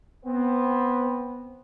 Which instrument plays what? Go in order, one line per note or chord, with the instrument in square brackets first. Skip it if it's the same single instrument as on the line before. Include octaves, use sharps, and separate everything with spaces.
[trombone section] B3 C4